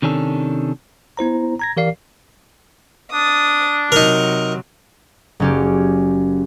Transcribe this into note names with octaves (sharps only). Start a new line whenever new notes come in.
C3 D#3 C#4 D4 A4
B3 E4 C5 A#5
A#5 G#6 A#6
E3 G4 A#4 D5 F5 C7
D4 D#6 A6
C3 F#3 D#4 A#4
F#1 C#4 G4